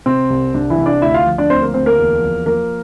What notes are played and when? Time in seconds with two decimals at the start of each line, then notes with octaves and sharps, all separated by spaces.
0.06 C3 C4
0.30 C2
0.54 C2 D4
0.70 E3 E4
0.78 C2
0.86 D4 D5
1.02 D2 E4 E5
1.14 F4 F5
1.26 F3
1.38 D4 D5
1.50 D2 C4 C5
1.62 A#3 A#4
1.74 D2 C4 C5
1.86 A#3 A#4
1.98 E2
2.22 F3
2.46 F3 A#3 A#4